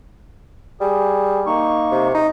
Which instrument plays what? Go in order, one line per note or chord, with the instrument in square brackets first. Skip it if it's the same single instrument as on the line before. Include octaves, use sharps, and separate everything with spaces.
[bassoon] G3 [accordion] G#4
[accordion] A#3 D#4 C#6
[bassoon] C3
D#4